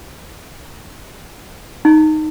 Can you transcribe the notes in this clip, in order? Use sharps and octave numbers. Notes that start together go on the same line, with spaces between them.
D#4